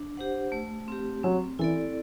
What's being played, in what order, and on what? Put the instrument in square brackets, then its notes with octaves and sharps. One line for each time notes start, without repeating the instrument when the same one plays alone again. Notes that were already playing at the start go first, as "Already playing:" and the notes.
Already playing: [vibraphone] D4
G4 C5 F#5
A3
C4 G4
[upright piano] F#3 [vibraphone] C4
[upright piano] E3 [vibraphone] E4 A4 D5